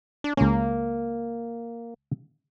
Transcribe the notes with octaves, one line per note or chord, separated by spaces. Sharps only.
D4
C#2 A#3 C#4